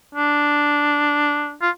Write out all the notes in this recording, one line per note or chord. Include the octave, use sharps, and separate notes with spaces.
D4
F4